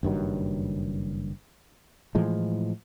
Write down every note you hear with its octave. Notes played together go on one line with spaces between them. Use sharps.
F#1 G2 D#3 F#3
A2 E3 F3 G#3